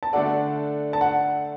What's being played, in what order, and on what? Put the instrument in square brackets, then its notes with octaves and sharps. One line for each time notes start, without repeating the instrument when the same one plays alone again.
[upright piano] A5
[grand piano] D3 A3 D4 A4 D5 [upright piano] F#5
[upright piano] A5
F#5